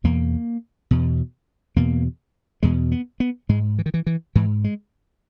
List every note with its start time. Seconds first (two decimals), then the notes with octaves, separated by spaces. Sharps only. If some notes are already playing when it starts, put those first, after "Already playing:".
0.04 E2 B2 A#3
0.91 E2 B2
1.76 E2 B2 A#3
2.63 E2 B2 G#3
2.92 B3
3.20 B3
3.49 G#2 G#3
3.79 E3
3.86 D#3
3.94 E3
4.07 E3
4.35 G#2 E3
4.64 G#3